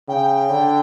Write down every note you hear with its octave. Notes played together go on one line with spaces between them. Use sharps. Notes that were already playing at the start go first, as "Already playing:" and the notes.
C#3 G5
D3